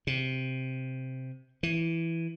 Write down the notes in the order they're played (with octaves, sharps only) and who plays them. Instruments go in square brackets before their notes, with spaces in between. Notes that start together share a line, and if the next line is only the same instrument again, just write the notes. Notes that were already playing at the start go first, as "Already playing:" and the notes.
[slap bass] C3
E3